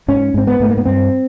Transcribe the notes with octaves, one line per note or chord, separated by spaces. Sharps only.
G#2 C#4
G#2 C4
B3
G#2 A3
A#3
B3
G2 C4